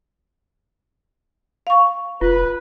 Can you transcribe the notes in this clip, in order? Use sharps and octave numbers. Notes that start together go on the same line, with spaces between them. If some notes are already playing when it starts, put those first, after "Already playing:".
F5 C#6
F1 F4 B4